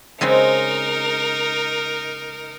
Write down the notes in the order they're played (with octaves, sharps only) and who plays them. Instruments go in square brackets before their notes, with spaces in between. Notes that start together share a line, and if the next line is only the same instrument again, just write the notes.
[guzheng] C#3 G#3 C4 [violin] D#4 A#4